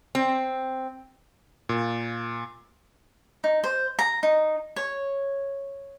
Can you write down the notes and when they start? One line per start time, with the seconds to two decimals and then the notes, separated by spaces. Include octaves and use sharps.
0.15 C4
1.69 A#2
3.44 D#4
3.64 C5
3.99 A#5
4.23 D#4
4.76 C#5